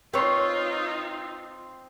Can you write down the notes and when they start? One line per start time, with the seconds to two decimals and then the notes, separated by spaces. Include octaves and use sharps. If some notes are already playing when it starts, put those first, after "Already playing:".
0.14 C4 D#4 F4 B4 C#5 C6